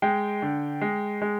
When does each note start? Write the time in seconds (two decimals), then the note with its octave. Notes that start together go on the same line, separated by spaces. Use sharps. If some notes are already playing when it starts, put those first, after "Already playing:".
0.02 G#3 G5
0.42 D3
0.81 G#3
1.22 G#3